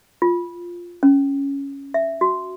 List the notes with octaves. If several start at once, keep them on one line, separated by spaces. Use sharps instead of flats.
F4
C#4
E5
F#4